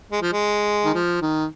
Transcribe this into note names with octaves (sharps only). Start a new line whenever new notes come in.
G#3
F3
G#3
D#3
F3
D#3